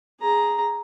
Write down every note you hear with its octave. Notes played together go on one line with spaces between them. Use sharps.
G#4 A#5